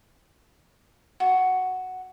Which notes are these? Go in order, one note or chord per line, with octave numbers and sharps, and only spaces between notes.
F#4